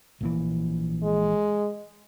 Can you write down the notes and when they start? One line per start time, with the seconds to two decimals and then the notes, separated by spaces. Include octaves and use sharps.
0.21 A#1 A#2 E3
1.03 G#3